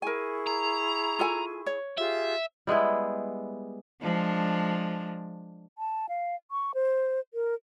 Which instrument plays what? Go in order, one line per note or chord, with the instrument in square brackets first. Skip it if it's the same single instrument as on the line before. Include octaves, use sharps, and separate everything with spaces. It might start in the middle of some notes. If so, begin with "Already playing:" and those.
[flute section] E4 G#4 C#6 [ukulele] A#4 G#5
[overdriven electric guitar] A#5
[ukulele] F4 A4 G#5
C#5
[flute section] F4 G4 G#4 [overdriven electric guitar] E5
[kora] G3 G#3 B3 E4
[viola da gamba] F3 G#3 D4
[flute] A5
F5
C#6
C5
A#4